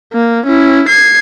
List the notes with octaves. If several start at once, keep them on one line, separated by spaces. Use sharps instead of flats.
A#3
C#4 E4
G#6 C7